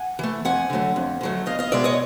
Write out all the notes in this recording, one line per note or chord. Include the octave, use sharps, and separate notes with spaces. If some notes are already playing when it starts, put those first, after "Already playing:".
Already playing: F#5 G#5
E3 A3
F2 F#5 G#5
D3 F#3 A3
F2
D3 F#3 A3
E2 D#5 F5
D#5 F5
B2 G#3 D5 E5
C#5 D#5